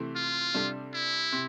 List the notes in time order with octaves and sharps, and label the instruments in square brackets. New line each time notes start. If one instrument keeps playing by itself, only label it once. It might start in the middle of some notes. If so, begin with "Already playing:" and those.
Already playing: [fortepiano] C3 E3 A3
[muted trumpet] F4
[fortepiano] C3 G3 D4 A4
[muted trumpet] E4
[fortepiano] C3